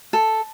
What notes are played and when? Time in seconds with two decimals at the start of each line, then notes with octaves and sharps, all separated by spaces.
0.13 A4